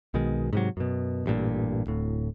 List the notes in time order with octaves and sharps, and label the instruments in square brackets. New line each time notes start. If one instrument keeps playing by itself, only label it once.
[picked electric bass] B1 B2 D#3 G#3
G#2 C3 F#3
F#2 B2
A1 G2 A#2
D1 A2